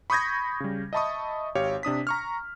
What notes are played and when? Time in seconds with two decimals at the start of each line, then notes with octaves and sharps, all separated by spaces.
0.10 B5 C#6 D#6 G6 G#6 A#6
0.60 C#3 G3
0.93 D#5 E5 A5 B5 C#6 D#6
1.55 G#1 G4 C#5 F5
1.83 C3 D4 D#6 B6
2.07 A#5 C#6 F6